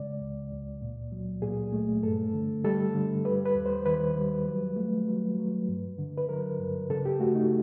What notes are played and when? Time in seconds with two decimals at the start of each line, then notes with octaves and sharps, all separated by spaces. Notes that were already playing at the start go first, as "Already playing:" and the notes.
Already playing: C#3 G#3 D5
0.21 C#2
0.51 C#2
0.81 A#2
1.12 F#3
1.42 A#2 G#4
1.73 A3
2.03 G2 A4
2.34 D3
2.64 G3 A4
2.94 D3
3.25 G3 B4
3.45 B4
3.55 D#2
3.66 C5
3.86 D#3 B4
4.17 G3
4.46 F#3
4.76 A3
5.08 F#3
5.38 F#3
5.68 G2
5.98 D3
6.18 B4
6.29 F#3 A#4
6.59 G2
6.90 C#3 A4
7.05 G4
7.20 A3 F#4
7.35 D#4